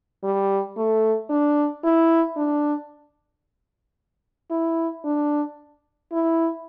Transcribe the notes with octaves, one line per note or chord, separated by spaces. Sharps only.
G3
A3
D4
E4
D4
E4
D4
E4